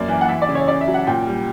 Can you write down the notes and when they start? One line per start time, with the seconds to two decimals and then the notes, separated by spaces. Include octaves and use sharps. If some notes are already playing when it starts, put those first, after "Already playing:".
Already playing: F#2 A#3 D5
0.08 E3
0.21 F#5
0.29 E3 E5
0.42 D5
0.49 C#3
0.55 C#5
0.68 C#3 D5
0.81 E5
0.88 F#3
0.94 F#5
1.07 A#2 G5
1.27 G3